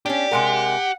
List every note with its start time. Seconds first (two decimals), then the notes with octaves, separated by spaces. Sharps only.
0.06 C#4 D4 G4
0.31 C3 G#3 A#4 F#5